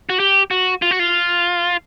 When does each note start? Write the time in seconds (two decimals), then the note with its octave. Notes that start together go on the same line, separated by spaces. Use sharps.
0.09 F#4
0.20 G4
0.51 F#4
0.82 F4
0.91 F#4
0.99 F4